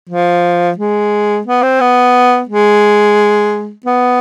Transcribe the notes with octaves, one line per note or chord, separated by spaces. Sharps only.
F3
G#3
B3
C4
B3
G#3
B3